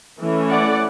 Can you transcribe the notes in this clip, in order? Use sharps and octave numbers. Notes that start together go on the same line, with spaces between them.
E3 A3 C#4
D5 F#5